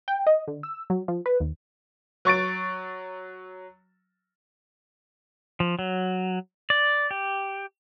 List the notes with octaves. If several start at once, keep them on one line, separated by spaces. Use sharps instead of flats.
G5
D#5
D3
E6
F#3
F3
B4
D#2
F#3 C#6 A6 D7
F3
F#3
D5
G4